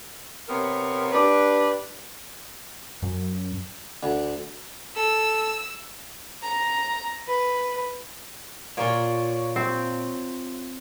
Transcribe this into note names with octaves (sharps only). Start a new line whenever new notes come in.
C3 B3 A#4 C#5
D4 G4 B4 D5
F#2
D2
A4 E6
A#5
B4
A#2 F4 A#4 C#5
C4